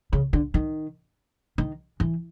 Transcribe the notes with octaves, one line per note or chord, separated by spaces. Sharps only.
C#3
D3
D#3
D#3
E3